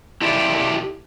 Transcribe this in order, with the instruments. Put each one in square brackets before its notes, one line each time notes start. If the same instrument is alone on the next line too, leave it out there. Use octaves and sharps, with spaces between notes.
[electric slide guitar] E4 F4 G4 A4 D5 E5